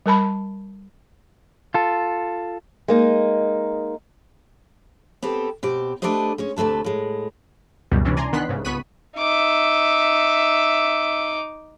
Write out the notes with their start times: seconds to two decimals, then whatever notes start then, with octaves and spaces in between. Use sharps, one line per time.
0.06 G3 A#4 A5 B5
1.74 F4 A4
2.88 G#3 A#3 D#4
5.23 B3 C4 G4 A4
5.63 B2 C4 G4
6.02 A3 D4 G4 B4 C5 D#5
6.38 G#3 C#4 C#5
6.56 D2 C3 A3 B4 A5
6.84 A2 G#3
7.91 C#2 F#2 B2 G3
8.05 C3 E3 C#4 D4
8.17 D5 G#5 A#5 C6
8.33 D#3 B3 D4 C6 F#6 B6
8.49 C2 G#2 C#3
8.65 C#2 B3 C#6 F#6 B6 D#7
9.17 D#4 E5 D6